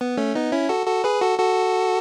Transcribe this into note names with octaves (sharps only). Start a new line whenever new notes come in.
B3
A3 C#4
B3 D#4
C#4 E4
F#4 A4
F#4 A4
G#4 B4
F#4 A4
F#4 A4